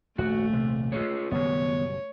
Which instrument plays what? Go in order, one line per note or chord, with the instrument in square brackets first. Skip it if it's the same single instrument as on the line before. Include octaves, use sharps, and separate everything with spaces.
[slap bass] D#1 A#1 G#2 [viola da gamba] A3 [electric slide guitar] F#4
[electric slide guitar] C3
F4 G#4 C#5
[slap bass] F#1 B2 G3 [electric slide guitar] D#3 B3 [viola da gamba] C#5